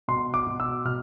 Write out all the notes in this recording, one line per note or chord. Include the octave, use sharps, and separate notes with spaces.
B2 C6
D6
B2
E6
B2 F6